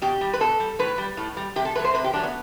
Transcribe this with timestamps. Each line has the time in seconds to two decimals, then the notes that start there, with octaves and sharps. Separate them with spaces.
0.02 B2 G4
0.21 G3
0.33 B4
0.40 B2 A4
0.60 G3
0.79 A2 B4
0.98 G3
1.17 A2
1.37 G3
1.56 C3 G4
1.65 A4
1.75 F#3 A3 B4
1.85 C5
1.94 C3 B4
2.04 G4
2.13 F#3 A3 D4
2.23 B3